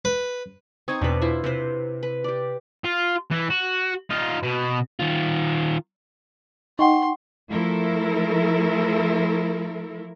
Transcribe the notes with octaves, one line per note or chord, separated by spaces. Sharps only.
B4
C4 D#4 C#6 D#6 G#6
E2 B2 D4 B4
E4 F4 C5
C3 B4 C5
B4
G4 D5
F4
E3
F#4
D#4 F4
B2
D#3 F4
D#4 F#5 G5 C6 C#6
F3 A3 E4 A4 A#4